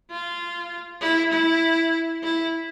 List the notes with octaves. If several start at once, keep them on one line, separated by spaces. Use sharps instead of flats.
F4
E4
E4
E4